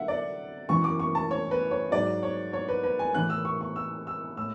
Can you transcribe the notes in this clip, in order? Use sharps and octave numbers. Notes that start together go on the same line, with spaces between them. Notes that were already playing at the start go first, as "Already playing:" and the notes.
Already playing: D3 F#3 E5 F#5
D5
F#2 E3 C#6
D6
C#6
A5
C#5
B4
C#5
G#2 F#3 D5
C#5
C#5
B4
B4
G#5
A2 E3 F#6
E6
C#6
C#6
E6
E6
A2 E6